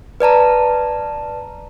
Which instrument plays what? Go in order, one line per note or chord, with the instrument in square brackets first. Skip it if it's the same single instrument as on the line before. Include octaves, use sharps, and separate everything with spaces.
[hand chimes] B4 D5 A5 A#5